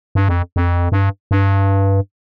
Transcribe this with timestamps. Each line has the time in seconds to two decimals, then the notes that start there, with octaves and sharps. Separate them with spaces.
0.15 G2
0.28 F2
0.56 F2
0.92 G2
1.31 G2